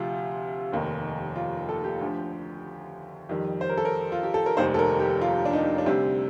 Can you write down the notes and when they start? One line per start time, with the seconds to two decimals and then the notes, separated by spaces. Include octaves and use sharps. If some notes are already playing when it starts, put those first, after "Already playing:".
Already playing: D2 C3 F3 F4
0.72 F1 D#2 D#3
1.36 F4
1.69 A4
1.84 G4
2.01 D2 D3 F3
3.29 F2 D#3 G3 G4
3.61 C5
3.69 A#4
3.78 A4
3.85 A#4
4.12 F4
4.23 G4
4.34 A4
4.46 A#4
4.57 F1 D#2 D#3 G3 C5
4.74 A4
4.79 A#4
5.00 G4
5.21 F4
5.45 D4
5.53 D#4
5.78 D4
5.86 D2 C3 G3 C4